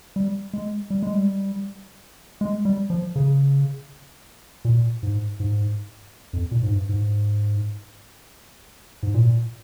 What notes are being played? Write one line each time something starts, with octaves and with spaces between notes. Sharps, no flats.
G3
G#3
G3
G#3
G3
G#3
G3
F3
C#3
A#2
G#2
G#2
F2
A#2
G#2
G2
G#2
G#2
A#2